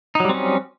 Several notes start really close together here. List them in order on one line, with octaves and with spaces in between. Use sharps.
D#4 F#3 G3 C4 C#4